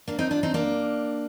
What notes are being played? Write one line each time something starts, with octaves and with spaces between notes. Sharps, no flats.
A#3 D4
C4 D#4
D4 F4
C4 D#4
A#3 D4